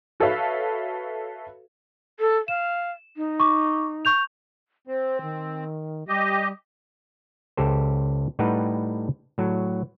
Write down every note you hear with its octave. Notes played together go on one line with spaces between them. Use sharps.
F#4 A4 B4 C#5 E5 F5
A4
F5 E7
D#4
C#6 D6
C#6 G6 F7
C4 C5
D#3
G3 G4 D#5
C#2 G4 A4 C5
A2 G3 D#4 B4 F#5 G5
A2 F#3